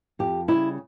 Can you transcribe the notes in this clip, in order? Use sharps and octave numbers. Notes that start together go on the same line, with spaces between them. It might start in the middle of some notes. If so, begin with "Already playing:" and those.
F2 G4
C#3 G3 E4